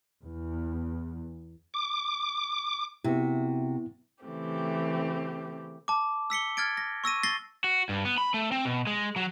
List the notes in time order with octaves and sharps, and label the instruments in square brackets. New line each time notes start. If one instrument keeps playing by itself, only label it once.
[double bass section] E2
[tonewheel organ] D6
[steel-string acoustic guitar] C3 F#4 [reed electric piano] B3 E4
[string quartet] C#3 E3 A3 C4 G4
[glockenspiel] A5 D6
E6 B6 C#7 G7
F6 G#6 A6 D7
A#6
C#6 E6 A#6 D#7
A6 A#6 C7 G7
[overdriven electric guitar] F#4
G2
B3
B5
A3
C4
B2
G#3
F#3